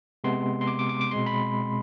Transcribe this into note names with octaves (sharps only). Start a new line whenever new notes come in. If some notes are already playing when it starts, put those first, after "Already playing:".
C3 G#3 B3 C6
C6
D6
D6
D6
D6
B2 G#3 C4 C6
B5